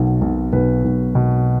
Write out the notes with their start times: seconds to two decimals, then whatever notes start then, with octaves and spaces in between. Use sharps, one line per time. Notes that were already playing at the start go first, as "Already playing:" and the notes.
Already playing: B1 B2 F#4
0.21 B1
0.53 B1 B4
0.84 B1
1.15 B2